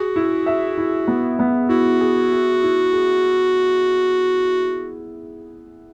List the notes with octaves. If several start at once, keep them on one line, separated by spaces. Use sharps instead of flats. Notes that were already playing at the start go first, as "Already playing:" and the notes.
Already playing: F#4 G#4
E4
E5
E4
B3
B3
E4 F#4
G#4
G#4
E4
G#4